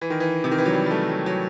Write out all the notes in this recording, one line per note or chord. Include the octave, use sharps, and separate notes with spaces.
E3
D#3
E3
C3
D#3
E3
F#3
G3
G3
A3
F#3
F#3